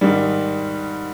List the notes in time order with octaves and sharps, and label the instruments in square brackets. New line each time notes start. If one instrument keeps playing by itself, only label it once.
[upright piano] G#2 D#3 G3